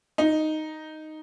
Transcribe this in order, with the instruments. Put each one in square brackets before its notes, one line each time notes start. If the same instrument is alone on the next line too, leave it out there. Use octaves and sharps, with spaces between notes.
[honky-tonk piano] D#4